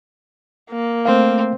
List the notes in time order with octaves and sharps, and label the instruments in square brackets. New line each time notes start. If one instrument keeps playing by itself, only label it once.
[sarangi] A#3
[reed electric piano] A3 F5 [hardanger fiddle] C4